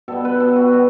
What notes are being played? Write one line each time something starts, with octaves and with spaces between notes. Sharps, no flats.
B2 G3 B3 A4
B4
A4
F#4
G3 B3